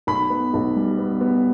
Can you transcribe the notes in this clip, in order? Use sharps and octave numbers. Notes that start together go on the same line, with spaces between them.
B1 B5
B3
B1
G3
B3
B3